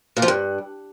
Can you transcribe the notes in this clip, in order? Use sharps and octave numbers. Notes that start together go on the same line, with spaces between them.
A#2
F3
G2